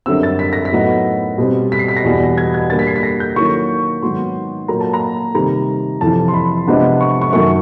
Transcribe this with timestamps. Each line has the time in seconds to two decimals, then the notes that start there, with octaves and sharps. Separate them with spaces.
0.06 F#2 D3 G3 C4 E6
0.23 A6
0.39 B6
0.53 A#6
0.65 B6
0.72 A2 F#3 B3 D#4
1.38 B2 G3 C4
1.72 B6
1.79 C7
1.88 B6
1.97 A#6
2.04 E2 B2 G3 B3
2.38 G#6
2.54 G#6
2.70 D3 G3 A#3 A6
2.79 B6
2.87 C7
2.96 B6
3.03 A#6
3.20 G6
3.36 D#3 F#3 A#3 C#4 E4 C#6
4.02 G#2 D#3 F#3 B3 C6
4.68 A#2 F#3 A#3 A#5
4.80 A5
4.94 A#5
5.34 C3 D#3 G3 C4 A#5
6.01 F2 C3 E3 A5
6.28 C6
6.34 B5
6.67 C3 F3 G#3 B3 D4
7.01 C#6
7.21 C#6
7.33 F#2 D#3 F#3 A3 C#6